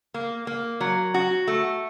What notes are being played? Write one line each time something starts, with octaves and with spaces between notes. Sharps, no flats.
A#3
A#3
F#3
F#4
A3